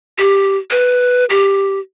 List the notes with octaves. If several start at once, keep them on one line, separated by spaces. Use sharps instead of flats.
G4
B4
G4